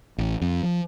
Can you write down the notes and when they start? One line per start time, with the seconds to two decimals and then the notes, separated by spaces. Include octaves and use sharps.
0.18 A1
0.41 F2
0.63 F3